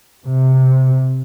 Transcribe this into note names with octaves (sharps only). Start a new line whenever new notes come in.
C3